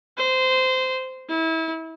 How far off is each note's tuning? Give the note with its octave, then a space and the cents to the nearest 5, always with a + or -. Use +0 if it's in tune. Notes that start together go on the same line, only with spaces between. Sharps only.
C5 -15
E4 -30